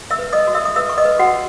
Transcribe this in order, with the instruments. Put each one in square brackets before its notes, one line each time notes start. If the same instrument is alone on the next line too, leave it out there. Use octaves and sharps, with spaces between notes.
[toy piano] E5 E6
B4
D#5 D#6
F#4
E5 E6
D#6
B4 E5 E6
C#6
D#5 D#6
B4
F#4 F#5